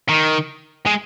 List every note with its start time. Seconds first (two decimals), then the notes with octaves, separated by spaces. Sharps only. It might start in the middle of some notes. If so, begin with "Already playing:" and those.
0.09 D#3
0.86 G#3